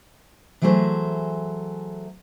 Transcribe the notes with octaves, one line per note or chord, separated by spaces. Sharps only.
E3 F#3 A3 G#4 C5